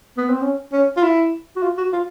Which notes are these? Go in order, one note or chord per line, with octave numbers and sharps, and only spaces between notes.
B3
C4
C#4
C#4
F4
E4
F#4
F4
F#4
F4